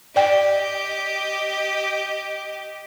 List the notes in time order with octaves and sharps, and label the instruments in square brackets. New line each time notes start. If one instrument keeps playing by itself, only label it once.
[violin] G4 D#5 [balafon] D5 G5